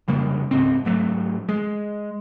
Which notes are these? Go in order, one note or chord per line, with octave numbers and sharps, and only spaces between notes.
F1 C#3 G3 A#3
C#2 G#2 C4
G#2 F#3 A3
G#3